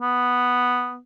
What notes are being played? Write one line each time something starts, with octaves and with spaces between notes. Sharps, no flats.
B3